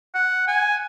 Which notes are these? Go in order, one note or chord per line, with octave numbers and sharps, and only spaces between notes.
F#5
G#5